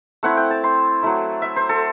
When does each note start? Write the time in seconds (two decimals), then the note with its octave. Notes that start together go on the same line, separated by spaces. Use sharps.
0.23 A3 C4 E4 F#5
0.37 G5
0.50 A5
0.64 C6
1.03 F#3 A3 E4
1.42 E5
1.56 C5
1.69 A4